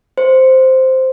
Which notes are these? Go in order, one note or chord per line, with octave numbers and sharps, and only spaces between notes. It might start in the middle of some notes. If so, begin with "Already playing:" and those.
C5